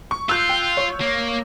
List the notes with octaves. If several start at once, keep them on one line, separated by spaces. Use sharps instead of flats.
C#6
F4 E6 F#6 G6
G5
C#5
A#3